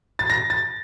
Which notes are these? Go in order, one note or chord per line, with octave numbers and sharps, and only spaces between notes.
A6
A#6
A6